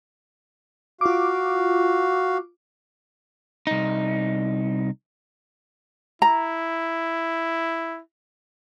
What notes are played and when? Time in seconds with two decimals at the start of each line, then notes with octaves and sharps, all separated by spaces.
1.01 F4 F#4 F5 D6
3.67 C2 D#4
6.22 E4 A#5